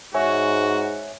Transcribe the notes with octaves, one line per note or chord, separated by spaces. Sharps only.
G#2 F#4 C#5 E5 G#5